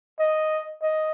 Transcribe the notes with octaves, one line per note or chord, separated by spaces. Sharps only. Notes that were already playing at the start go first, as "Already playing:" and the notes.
D#5
D#5